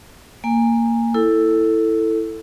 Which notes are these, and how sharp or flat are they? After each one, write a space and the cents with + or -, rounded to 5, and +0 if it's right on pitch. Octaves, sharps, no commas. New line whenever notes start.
A#3 -10 G#5 -20
E4 +0 A4 +10